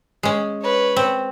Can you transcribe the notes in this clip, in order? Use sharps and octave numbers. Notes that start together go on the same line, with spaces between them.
G#3 C#4
B4 C#5
C4